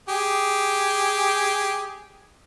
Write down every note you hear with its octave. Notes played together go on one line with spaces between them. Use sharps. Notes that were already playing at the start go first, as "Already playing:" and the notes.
G4 G#4